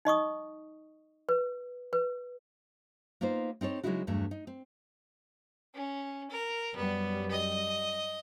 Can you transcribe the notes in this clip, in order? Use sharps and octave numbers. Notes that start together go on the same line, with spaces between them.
D#4 D#5 C#6 D#6
B4
B4
A#3 B3 D#4 F4 C5
C4 D#4 A4 C#5
C#3 F#3 G#3 D#4 E4 F#4
E2 G2 F#3 A3
D#4
C4
C#4
A#4
F#2 G3 B3
D#5